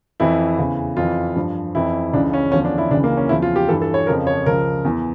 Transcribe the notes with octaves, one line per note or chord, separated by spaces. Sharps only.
F2 E3 E4
E2 C#3 E3
F2 E3 F4
G2 F3
F2 E3 E4
C#2 C#3 E3 D4
C#4
E2 D3 F3 C#4
D4
E4
C#2 C#3 E3 D4
A#3
C#4
E2 C#3 F3 E4
F4
G4
G2 E3 A4
A4
C#5
F2 C#3 F3 A#4
C#5
C#2 C#3 F3 A#4
E2 E3